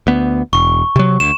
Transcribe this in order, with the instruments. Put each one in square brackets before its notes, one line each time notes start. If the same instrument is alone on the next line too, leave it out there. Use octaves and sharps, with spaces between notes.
[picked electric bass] D2 B3
[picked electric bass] E1 [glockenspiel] C#6
[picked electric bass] C3 F#3
[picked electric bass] D2 [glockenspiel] E7